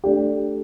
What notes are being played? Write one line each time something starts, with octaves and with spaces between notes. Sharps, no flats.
A3 D4 G4